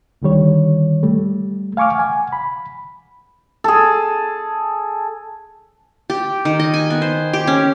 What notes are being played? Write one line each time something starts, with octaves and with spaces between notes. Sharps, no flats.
C#2 D3 D#3 G3 C#5
G3 A3
F5 G#5 C#6 D6 F6
F#5 G#5
B5
G#4 A4
G4
D#3
D#5
G#5
B3
C5
G4
C#4